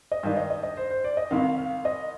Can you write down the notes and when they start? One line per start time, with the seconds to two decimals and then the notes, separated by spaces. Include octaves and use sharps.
0.12 D#5
0.23 G2 D#3 G3 F5
0.37 D#5
0.50 D#5
0.63 D#5
0.77 C5
0.90 C5
1.04 D5
1.17 D#5
1.31 C2 C3 D#3 F5
1.58 F5
1.85 D#5